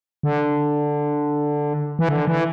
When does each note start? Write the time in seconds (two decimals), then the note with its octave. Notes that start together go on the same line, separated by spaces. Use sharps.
0.23 D3
1.99 E3
2.09 D3
2.27 E3